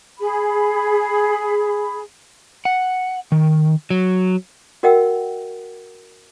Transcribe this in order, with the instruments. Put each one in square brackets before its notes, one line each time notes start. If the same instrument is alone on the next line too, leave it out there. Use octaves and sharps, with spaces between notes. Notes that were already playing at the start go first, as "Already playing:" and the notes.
[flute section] G#4 B5
[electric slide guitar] F#5
D#3
F#3
[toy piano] F#4 A#4 D#5 F#5 G5 E6